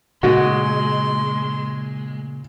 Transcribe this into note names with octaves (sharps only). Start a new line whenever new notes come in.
A#2 C#3 G#3 F#4 C6